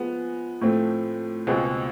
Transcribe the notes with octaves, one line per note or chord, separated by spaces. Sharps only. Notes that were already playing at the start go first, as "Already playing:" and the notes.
Already playing: F3 G#3 B3
A2 F3 A3 C4
C#2 B2 G#3 C4